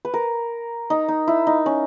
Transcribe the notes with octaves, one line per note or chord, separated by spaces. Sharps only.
B4
A#4
D#4
D#4
E4
D#4
C#4